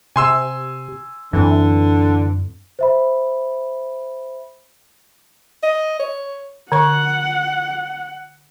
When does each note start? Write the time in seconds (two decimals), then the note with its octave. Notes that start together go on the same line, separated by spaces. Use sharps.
0.16 C3 G#5 C6 E6
1.33 F#2 D3 E3 C4
2.79 C5 E5 B5
5.63 D#5
6.00 C#5
6.72 D3 C#5 F#5 C#6